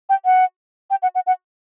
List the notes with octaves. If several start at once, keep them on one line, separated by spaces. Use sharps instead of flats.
G5
F#5
G5
F#5
F#5
F#5